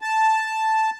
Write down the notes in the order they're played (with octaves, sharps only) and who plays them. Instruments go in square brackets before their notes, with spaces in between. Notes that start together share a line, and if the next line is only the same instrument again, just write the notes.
[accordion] A5